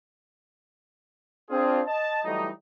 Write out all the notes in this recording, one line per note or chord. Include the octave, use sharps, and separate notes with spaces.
C4 D4 F4 G#4
D#5 A5
E3 F#3 G3 A3 D#4